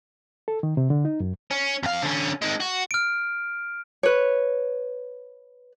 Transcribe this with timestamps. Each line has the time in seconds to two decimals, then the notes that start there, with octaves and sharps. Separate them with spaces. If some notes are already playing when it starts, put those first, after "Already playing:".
0.48 A4
0.63 D#3
0.77 C3
0.90 D3
1.05 D#4
1.20 F#2
1.51 C#4
1.83 F2 F5
2.02 D3 C#4
2.42 D#3 G#3
2.61 F#4
2.91 F6 D7
4.03 B4 C#5